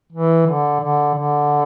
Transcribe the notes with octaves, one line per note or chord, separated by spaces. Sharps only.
E3
D3
D3
D3